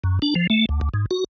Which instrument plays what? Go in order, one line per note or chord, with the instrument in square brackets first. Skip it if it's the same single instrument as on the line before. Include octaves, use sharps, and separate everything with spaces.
[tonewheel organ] F#2
D4
F3
A3
D2
D2
G#2
F#4